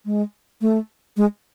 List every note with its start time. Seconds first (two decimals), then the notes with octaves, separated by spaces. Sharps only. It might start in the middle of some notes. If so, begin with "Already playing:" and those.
0.05 G#3
0.61 A3
1.17 G#3